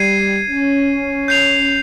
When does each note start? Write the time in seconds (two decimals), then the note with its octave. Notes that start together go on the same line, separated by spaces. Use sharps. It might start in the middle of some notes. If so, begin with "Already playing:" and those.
Already playing: G3 G#6 C7 D#7
0.49 C#4
1.28 G6 C7 F7